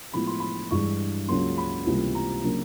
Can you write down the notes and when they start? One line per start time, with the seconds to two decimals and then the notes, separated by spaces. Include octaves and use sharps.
0.13 A2 F3 G#3 B3 B5
0.27 C6
0.40 B5
0.71 G2 E3 G#3 C#6
1.28 C#2 C#3 F#3 A#3 C6
1.58 B5
1.86 C#2 C3 E3 G3 A#3
2.15 A#5
2.44 C#3 F#3 A#3 D4